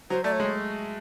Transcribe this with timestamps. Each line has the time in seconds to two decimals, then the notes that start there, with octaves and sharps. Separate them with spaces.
0.10 F#3 C5
0.24 A3 D5
0.32 C#5
0.40 G#3